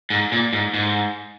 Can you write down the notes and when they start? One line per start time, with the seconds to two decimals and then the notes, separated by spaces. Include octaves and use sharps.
0.10 G#2
0.32 A#2
0.53 G#2
0.74 G#2